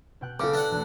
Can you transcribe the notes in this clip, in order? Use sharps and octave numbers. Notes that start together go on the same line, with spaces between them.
B2 G5 F#6
C#3 A4 D6
D4 F#5
E1 A3